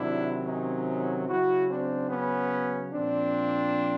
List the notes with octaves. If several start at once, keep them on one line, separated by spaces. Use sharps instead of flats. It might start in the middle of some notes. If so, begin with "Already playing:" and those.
Already playing: C3 D#3 F#3 D4 E4
C#4 D#4
C#3 F#3 E4 F#4
C4 D4
B3 C#4
A#2 F3 C4 D4